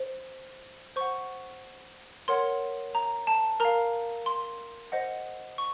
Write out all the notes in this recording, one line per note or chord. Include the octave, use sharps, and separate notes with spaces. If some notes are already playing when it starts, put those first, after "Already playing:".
Already playing: C5
C5 F#5 C#6
A#4 C#5 F#5 C6
A#5
A5
A#4 F5 A#5
C6
C5 D#5 F#5
C#6